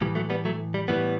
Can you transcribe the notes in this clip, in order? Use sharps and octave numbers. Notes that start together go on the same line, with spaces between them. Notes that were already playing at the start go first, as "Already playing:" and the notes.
A2 E3 G3
F#3 A3
G3 B3
F#3 A3
G3
A2 E3 G3 B3